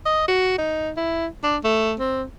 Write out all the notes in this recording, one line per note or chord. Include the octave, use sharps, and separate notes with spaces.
D#5
F#4
D#4
E4
D4
A3
C4